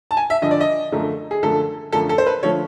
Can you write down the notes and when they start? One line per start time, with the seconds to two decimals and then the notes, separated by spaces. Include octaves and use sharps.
0.11 A5
0.17 G#5
0.30 E5
0.42 G2 D3 F3 D#5
0.51 D5
0.61 D#5
0.92 F#2 D3 F3 A3
1.31 G#4
1.43 F#2 D3 F3 A3 A4
1.92 F#2 D3 F3 A3 A4
2.09 A4
2.18 C5
2.26 B4
2.43 D3 F3 A3 C#5